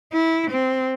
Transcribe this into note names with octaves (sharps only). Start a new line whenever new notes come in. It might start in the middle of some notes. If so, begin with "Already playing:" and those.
E4
C4